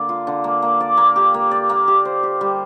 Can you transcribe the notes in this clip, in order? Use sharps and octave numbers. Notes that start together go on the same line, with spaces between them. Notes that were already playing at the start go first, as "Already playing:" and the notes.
Already playing: D3 A#3 D5
F4
D3
A#3
A#3
D5
A#3
G4
A#3
D5
A#3
G4
C5
G4
G3